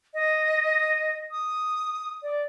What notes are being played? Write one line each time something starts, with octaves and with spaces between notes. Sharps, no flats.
D#5
D#6
D5